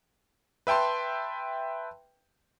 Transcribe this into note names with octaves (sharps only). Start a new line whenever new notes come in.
B4 E5 G5 A5 C6